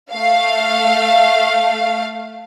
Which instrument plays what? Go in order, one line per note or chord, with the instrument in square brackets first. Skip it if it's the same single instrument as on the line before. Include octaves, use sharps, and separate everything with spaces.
[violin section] A3 F5